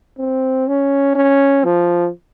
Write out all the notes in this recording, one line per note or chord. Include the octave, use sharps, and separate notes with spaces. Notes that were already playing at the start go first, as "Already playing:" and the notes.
C4
C#4
C#4
F3